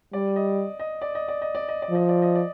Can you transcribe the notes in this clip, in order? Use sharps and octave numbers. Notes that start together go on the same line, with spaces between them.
G3 D5
D#5
D#5
D5
D#5
D5
D#5
D5
D#5
D5
F3 D#5
D5
D#5
D5